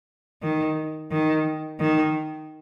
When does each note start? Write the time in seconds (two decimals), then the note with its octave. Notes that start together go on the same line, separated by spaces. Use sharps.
0.42 D#3
1.11 D#3
1.80 D#3